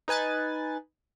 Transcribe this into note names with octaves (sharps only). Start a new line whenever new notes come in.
D#4 B4 G#5 F#6 A6